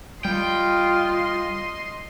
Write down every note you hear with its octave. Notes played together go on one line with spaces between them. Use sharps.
G3 F4 D#5 G5 C6